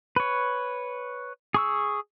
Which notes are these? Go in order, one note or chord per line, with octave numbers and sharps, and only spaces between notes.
B4 C#5
G#4 C#6 E6